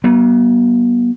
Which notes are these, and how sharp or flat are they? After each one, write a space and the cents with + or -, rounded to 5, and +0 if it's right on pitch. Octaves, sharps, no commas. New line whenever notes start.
F#3 +35 B3 -45